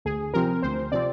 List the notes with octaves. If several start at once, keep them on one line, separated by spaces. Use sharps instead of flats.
D2 G#4
C3 F3 C4 A#4
D2 C5
C3 F3 C4 D5